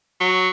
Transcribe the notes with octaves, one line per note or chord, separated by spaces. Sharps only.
F#3